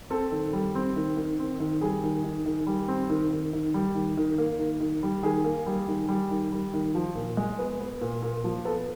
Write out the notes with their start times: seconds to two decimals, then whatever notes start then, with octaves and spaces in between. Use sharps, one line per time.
0.10 C4 A4
0.32 D#3
0.53 G3
0.75 C4
0.96 D#3
1.17 D#3
1.39 C4
1.60 D#3
1.81 G3 G#4
2.04 D#3
2.24 D#3
2.46 D#3
2.67 G3
2.88 C4
3.10 D#3
3.31 D#3
3.53 D#3
3.74 G3
3.95 D#3
4.17 D#3
4.38 A#3
4.59 D#3
4.80 D#3
5.03 G3
5.23 D#3 G#4
5.44 A#3
5.66 G3
5.88 D#3
6.08 G3
6.31 D#3
6.52 G3
6.74 D#3
6.95 F3
7.15 A#2
7.37 G#3
7.59 B3
7.80 B3
8.01 A#2
8.22 A#2
8.44 F3
8.65 B3 A4